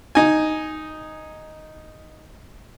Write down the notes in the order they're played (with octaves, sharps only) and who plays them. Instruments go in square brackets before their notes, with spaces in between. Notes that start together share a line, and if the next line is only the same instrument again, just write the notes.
[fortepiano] D#4 G#5